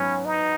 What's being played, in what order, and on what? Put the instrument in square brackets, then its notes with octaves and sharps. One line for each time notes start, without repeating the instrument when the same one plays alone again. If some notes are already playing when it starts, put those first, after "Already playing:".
Already playing: [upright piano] G#2 F#3 B3 B4 [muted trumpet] C#4
[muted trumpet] D#4